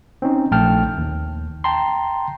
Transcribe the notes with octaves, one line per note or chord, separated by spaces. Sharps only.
C4 C#4 D#4
A#1 A3 G5 A5 F6
D#2
G5 A5 A#5 C6